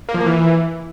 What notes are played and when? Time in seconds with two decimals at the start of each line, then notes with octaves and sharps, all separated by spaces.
0.09 A#3
0.14 F3
0.20 A#3
0.26 E3